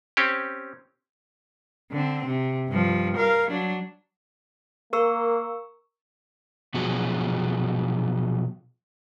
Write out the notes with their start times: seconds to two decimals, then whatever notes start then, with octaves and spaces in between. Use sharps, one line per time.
0.17 C4 C#4 G4
1.92 D3 C4
2.26 C3
2.69 G2 F3
3.17 A#4 F5
3.50 F#3 D4
4.93 A#3 A#4 C#6 E6
6.74 B2 F3 F#3 B3 F#4 G#4